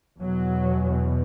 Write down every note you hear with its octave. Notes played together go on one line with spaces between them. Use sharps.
E2 B2 F#3